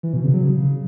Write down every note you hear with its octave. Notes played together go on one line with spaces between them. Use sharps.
E3
B2
C#3
F#3
C#3